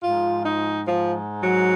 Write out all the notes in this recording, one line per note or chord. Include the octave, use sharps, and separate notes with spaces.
G#2 F3 F4
D#4
F3
F#3